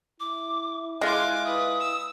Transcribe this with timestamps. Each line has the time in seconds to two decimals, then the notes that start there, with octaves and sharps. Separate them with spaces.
0.20 E4 D6
1.01 G#3 F4 G#5 D6 F#6
1.45 B4 D#6
1.80 E6